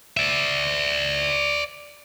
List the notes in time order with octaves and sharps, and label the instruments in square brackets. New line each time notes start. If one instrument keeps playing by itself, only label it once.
[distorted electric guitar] D5 E5